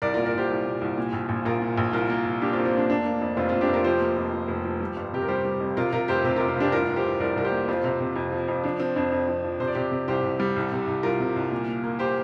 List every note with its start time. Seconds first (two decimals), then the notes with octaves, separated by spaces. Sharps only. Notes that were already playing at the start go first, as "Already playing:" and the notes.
0.02 C2 A#4 D5
0.14 F4 A#4
0.17 A#2
0.25 A#4 D5
0.34 C2 G4 C5
0.50 C2
0.66 A#2
0.81 C2
0.98 A#2
1.13 A#1
1.29 A#1
1.45 A#1 F4 A#4
1.62 A#2
1.78 A#1
1.93 C2 F4 A#4
2.10 A#3
2.26 C2
2.41 A#3 D4 G4
2.53 C4 F4
2.57 A#3
2.65 C4 F4
2.73 A#3 D4
2.89 F1 D4
3.05 A#3
3.21 F2
3.37 F1 C4 F4
3.49 F1 C4 F4
3.61 D4 G4
3.69 F1 F4 A#4
3.84 F3 G4 C5
4.01 A#3
4.17 F2
4.33 F3
4.48 F1
4.65 F3
4.80 G3
4.96 G1
5.13 C3 G4
5.22 A#4
5.28 G3 G4 C5
5.45 G3
5.60 F2
5.77 C3 F4 A#4
5.92 C3 F4 A#4
6.08 F1 G4 C5
6.24 C3 G4 C5
6.36 F4 A#4
6.40 F1
6.48 C4 F4
6.57 F1 D4 G4
6.72 C2 F4 A#4
6.89 C2
6.96 G4 C5
7.04 C2
7.20 C2 A#4 D5
7.36 C2 A#4
7.44 G4 C5
7.52 A#3
7.68 F2 C4 F4
7.84 C3
8.00 C3
8.16 F2
8.32 F3
8.48 F2
8.64 F3 D4
8.80 F3 C4
8.96 F2 D4
9.12 F2
9.28 F2
9.44 F3
9.60 C3 C5
9.67 D5
9.75 C3 G4 C5
9.92 C3
10.08 C2 G4 C5
10.24 C2
10.40 G3
10.56 C2
10.72 C3
10.87 C2
11.03 C2 F4 A#4
11.20 C3
11.36 C2
11.51 A#2
11.68 A#3
11.84 A#3
11.99 G4 C5